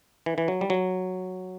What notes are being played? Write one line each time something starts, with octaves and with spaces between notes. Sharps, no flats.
E3
E3
F#3
G3
F#3